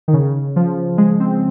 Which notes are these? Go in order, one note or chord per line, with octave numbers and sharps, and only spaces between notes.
D#3
C#3
F3
G#3
C4